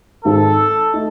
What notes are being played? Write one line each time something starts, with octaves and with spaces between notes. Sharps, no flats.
G#1 G#2 D#3 G#3 A4
A3 D#4